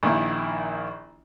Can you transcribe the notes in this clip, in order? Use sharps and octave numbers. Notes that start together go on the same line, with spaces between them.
A#1 D#3 A#3 E4